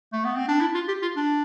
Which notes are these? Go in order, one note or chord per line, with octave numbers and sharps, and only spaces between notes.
A3
B3
C4
D4
E4
F4
G4
F4
D4